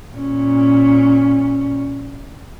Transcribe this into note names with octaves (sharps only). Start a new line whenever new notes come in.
A#2 C#4